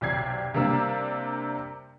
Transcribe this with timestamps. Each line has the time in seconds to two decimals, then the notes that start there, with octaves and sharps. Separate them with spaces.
0.01 B1 C3 G4 D5 G#6 C7
0.54 C3 G3 A#3 D4 E6